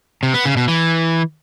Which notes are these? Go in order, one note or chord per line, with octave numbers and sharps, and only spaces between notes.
C3
B3
C#3
B2
E3